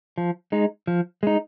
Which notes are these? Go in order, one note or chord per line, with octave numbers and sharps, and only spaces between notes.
F3
G#3 D#4
F3
G#3 D#4